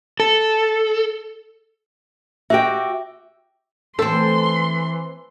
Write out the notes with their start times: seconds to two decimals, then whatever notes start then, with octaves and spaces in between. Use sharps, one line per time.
0.20 A4
2.50 F#4 G4 E5 G5
3.99 E3 A3 C4 A4 C6